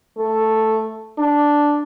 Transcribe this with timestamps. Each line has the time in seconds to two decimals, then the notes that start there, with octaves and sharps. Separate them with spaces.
0.18 A3
1.18 D4